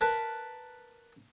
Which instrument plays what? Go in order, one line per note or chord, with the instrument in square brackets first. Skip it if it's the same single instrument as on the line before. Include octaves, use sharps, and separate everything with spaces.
[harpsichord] A#4 B4 A5